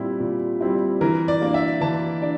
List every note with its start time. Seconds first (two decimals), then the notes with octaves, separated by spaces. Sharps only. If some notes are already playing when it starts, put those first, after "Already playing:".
Already playing: A#2 G3 C4 E4
0.20 A#2
0.61 G3 C4 E4
1.01 E3 A#4
1.28 D5
1.41 A#3 D4
1.54 E5
1.81 E3 A5
2.22 D4